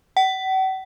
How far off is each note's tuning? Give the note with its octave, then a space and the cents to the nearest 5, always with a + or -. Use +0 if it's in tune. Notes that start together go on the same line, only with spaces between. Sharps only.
F#5 +45